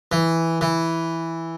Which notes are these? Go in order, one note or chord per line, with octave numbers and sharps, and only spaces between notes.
E3
E3